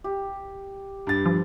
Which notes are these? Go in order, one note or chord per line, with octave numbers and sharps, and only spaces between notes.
G4
G2 A6
F3